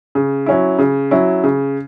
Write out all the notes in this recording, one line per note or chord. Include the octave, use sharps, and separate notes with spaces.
C#3
F#3 C#4 E4
C#3
F#3 C#4 E4
C#3